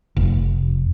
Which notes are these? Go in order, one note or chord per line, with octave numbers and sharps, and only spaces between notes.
F1